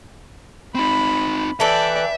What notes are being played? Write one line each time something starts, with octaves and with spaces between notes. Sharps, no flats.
C4 D#4 B5
E3 A4 B4 D5 E5 G5